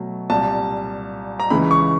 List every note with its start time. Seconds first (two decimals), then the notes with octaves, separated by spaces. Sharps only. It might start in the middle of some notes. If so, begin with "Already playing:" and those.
Already playing: B2 F#3 A3
0.30 C2 A#2 G3 A5
1.40 A#5
1.50 C#2 C#3 E3 G#3 B5
1.71 C#6